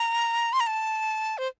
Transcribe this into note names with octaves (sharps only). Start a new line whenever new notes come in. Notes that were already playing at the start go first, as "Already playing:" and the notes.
Already playing: A#5
C6
A#5
A5
C5